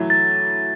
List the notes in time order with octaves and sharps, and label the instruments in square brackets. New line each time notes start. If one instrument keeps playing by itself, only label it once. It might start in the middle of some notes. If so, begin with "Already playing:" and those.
Already playing: [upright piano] E3 F#3 A3
[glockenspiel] A6